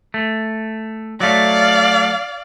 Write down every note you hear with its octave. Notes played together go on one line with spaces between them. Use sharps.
A3
F#3 A3 D5 F5